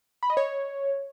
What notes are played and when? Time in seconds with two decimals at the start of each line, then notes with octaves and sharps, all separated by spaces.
0.23 B5
0.30 D#5
0.37 C#5